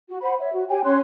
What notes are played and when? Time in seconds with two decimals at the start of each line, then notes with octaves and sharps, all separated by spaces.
0.08 F#4
0.22 C5 F#5 B5
0.40 C#5 E5
0.54 F#4
0.69 G4 C#5 G5 G#5
0.84 C#4 C#5 C6 F#6